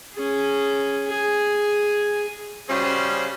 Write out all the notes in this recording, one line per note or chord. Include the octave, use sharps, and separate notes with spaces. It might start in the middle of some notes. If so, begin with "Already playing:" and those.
C#4 G#4
G#4 G#5
C#3 G3 C#4 F#4 G#4 C5